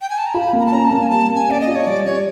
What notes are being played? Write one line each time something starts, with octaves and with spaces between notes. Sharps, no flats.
G5
G#5
A5
A#5
F4 B5
A#3
A#5
A5
C#4 A#5
A5
A#3
G#5
G3 A5
A#3
G#5
C#4 D5
D#5
F4
C#5
G3 D5
G3 C#5